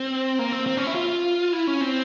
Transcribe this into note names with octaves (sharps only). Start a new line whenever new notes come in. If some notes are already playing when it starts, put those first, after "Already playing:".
Already playing: C4
A#3
C4
C4
C#4
E4
F4
E4
C#4
C4